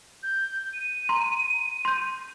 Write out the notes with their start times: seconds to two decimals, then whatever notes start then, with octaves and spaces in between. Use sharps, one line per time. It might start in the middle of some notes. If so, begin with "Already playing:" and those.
0.23 G6
0.73 D#7
1.09 A#5 C6
1.85 C6 G6